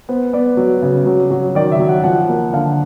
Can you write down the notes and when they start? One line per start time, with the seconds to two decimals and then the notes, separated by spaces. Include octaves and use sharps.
0.09 B3 C5
0.33 B3 D5
0.57 F#3
0.82 C#3
1.06 F#3
1.31 F#3
1.55 D#3 D5
1.72 E5
1.79 F#3
1.88 F#5
2.04 F3 F#5
2.29 A#3
2.53 D3 F5